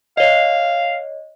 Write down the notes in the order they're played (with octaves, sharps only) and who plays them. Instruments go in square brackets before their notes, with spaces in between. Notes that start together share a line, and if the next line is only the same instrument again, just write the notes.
[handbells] C#5 D#5 [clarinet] F5